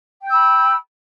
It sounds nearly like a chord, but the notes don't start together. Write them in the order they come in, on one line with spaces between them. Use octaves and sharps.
G5 G6 E6 B5